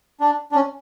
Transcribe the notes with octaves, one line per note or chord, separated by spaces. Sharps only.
D4
D4
C#4